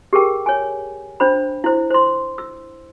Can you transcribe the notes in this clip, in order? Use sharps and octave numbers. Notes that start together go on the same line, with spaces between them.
G4 G#4 A#4 G5
C#5 G#5
D4 C5 B5
E4 C5
C5 C6
E6